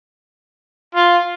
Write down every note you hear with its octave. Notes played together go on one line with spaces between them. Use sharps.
F4